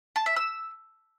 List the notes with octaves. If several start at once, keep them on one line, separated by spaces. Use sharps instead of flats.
A5
E5
E6